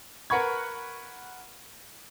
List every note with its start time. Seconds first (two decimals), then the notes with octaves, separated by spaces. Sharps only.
0.30 A#4 B4 F#5 B5 C#6 G#6